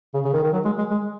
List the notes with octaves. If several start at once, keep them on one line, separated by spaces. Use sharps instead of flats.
C#3
C#3
D#3
D#3
F#3
G#3
G#3
G#3